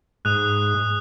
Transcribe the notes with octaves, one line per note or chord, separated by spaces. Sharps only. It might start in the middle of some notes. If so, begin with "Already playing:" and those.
G#2 D#6 F#6